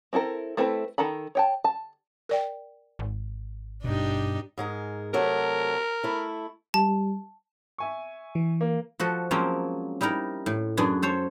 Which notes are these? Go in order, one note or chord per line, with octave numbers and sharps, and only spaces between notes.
C4 E4 A4 A#4
A3 C4 E4 A4 B4
D#3 A4 A#5 B5
C#5 G5 A5
A5
A#4 D5 G5
G#1
G2 B2 D4 D#4 G4
G#2 G#3 A#4
C3 F#3 A3 A#4
A3 E4
G3 A5
E5 G#5 C#6
E3
A#3
F3 F#4 A4 D#5
F3 F#3 G#3 A#3 C4 C#4
G3 D#4 E4 A#4
A2
F#2 B3 D4 G#4
A4 C5 C#5